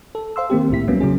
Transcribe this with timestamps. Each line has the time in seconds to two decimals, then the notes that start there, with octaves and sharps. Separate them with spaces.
0.15 A4
0.36 C5 F5 C6 E6
0.50 D#3 A#3 C4 G4
0.70 C2 A2 E4 B6
0.88 A2 F#3 G3 A#3 B3 C#4
1.00 C#3 F#3 C#4 G#4